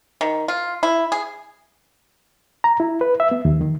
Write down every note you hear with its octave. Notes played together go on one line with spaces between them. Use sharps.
D#3
F4
E4
G#4
A#5
E4
B4
E5
B3
D#2
D#3